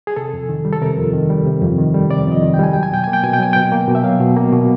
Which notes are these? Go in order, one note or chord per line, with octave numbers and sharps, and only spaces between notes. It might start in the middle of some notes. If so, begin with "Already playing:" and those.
G#4
C3 A4
F2
D#3
G3
A4
C3 A#4
F2
D#3
G3
C3
F2
D#3
G3
C3 D5
F2 D#5
D#3
G5
G3 G#5
F#3 G5
G#5
B2 G5
A#3 G#5
G5
B2 G#5
G5
F#3 G#5
B2 G5
A#3
B2
E5
F#3 F5
B2
A#3
B2